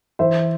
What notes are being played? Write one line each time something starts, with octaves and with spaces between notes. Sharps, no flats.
E3 C5 E5